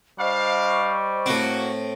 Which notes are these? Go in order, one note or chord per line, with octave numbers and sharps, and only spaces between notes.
G3 D4 C5 D#5 F5 C#6
A2 A#3 C4 F#4